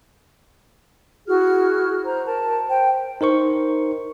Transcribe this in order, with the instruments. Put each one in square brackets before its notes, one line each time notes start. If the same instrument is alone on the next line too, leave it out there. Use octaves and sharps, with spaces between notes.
[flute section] E4 F#4 G#4 F6
C5 A#5
A#4 A5
C5 G5
[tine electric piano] D#4 A#4 C5 C#6